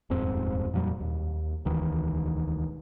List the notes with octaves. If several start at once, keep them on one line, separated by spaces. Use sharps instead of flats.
D#1 F2 G#2 C4
F2 A#2 F#3 G3
D#2
E1 D2 D#3 E3